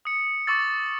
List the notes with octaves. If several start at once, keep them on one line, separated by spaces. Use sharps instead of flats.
D#6 C#7
C#6 D6 E6 A6